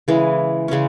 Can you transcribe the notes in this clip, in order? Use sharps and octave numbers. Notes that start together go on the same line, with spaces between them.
C#3 E3 G#3
C#3 G#3 C#4